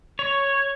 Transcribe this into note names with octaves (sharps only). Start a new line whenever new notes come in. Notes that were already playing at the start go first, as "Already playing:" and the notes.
C#5